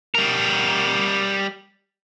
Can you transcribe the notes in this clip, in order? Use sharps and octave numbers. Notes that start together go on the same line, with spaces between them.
G3 A#4